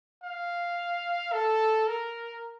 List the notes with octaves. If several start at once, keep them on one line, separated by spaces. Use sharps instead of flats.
F5
A4
A#4